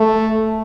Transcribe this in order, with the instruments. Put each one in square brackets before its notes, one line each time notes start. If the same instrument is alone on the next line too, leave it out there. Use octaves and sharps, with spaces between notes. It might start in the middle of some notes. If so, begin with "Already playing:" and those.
Already playing: [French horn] A3